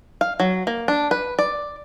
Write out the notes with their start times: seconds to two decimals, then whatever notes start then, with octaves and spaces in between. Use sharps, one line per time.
0.21 F5
0.40 F#3
0.67 A#3
0.88 D4
1.11 B4
1.39 D5